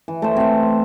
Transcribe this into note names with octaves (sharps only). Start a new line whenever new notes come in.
E3
A3 C5
C4 E5